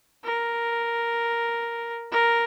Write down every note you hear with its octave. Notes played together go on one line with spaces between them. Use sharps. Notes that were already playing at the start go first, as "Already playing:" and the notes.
A#4
A#4